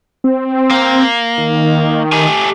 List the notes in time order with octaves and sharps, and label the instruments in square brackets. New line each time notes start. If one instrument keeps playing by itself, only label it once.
[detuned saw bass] C4
[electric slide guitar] A#3
[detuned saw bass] D#3
[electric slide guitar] A3 G4 G#5